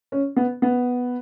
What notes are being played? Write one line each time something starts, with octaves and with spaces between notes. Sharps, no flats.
C#4
B3
B3